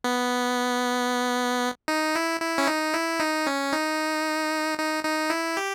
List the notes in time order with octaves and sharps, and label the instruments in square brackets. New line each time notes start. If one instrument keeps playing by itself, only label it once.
[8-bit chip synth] B3
D#4
E4
E4
C#4
D#4
E4
D#4
C#4
D#4
D#4
D#4
E4
G4